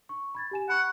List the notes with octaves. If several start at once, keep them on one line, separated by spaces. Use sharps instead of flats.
C#6
B5 G#6 A6
G4 G#5 E7
F#5 B5 C#6 F6